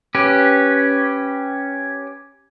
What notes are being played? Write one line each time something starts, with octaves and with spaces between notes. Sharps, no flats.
C#4 G4 B4